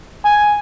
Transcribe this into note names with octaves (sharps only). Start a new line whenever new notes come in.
G#5